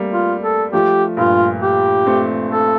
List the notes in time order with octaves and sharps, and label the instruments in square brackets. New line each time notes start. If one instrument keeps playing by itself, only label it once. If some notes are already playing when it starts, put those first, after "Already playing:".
Already playing: [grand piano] G3 A3 A#3 C4
[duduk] F4
A4
[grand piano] F3 A3 [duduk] G4
[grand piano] G2 A#2 [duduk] F4
[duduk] G4
[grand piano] A3 C4
[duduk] A4